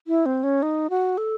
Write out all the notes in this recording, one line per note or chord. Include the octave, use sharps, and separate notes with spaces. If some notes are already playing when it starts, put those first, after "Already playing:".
E4
C4
C#4
D#4
F#4
A4